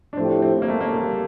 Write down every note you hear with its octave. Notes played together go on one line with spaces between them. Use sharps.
D4
A2 F3 A3 C4 E4 G4
C4
A#3
A3
A#3
G3